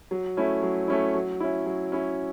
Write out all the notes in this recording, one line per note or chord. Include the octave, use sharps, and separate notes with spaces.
F#3
A3 C#4 E4
F#3
A3 C#4 E4
F#3
C#4 E4
F#3
C#4 E4